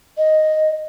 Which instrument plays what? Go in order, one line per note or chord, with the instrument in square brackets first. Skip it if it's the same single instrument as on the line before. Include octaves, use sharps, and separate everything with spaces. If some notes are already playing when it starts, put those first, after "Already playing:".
[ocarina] D#5